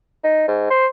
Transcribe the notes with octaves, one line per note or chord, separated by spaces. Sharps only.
D#4
G#2
C5